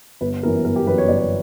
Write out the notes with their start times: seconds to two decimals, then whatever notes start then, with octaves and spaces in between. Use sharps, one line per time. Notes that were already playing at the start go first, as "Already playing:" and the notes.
0.21 G1 B4
0.43 F#2 E3 B3 A#4
0.65 G1 A#4
0.76 G4
0.87 F#2 E3 B3 B4
0.98 C#5
1.08 G1 D5
1.18 C#5